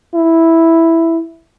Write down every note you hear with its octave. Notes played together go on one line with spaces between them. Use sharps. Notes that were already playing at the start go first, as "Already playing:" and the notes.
E4